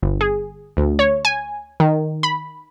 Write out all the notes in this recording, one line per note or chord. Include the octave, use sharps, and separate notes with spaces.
G1
G#4
D2
C#5
G#5
D#3
B5